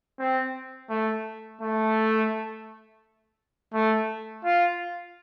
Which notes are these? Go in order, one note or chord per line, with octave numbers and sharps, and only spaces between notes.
C4
A3
A3
A3
F4